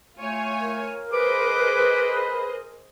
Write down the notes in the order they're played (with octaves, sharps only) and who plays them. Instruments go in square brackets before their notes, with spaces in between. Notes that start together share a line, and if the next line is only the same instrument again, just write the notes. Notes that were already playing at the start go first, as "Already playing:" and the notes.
[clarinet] A3 [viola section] F4 C#5 G#5
[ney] A#4
[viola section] G#4 C5 D#5 [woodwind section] B4 [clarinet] D6